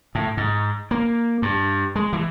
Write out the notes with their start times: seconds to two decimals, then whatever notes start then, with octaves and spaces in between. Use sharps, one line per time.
0.15 A2
0.37 G#2
0.91 A#3
1.42 G2
1.96 G#3
2.13 E3